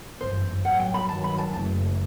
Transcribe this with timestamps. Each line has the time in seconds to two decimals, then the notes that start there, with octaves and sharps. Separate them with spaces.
0.21 G1 F#2 E3 C5
0.65 A1 G2 F#3 F#5
0.80 G5
0.94 B5
1.09 G2 D#3 F#3 A5
1.24 B5
1.38 A5
1.53 F#1 F#2 E3 A3 A5